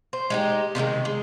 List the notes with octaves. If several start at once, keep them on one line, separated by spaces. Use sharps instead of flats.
C5
G#3 D#4 G4
C3 D#3 E3 G#3
G#3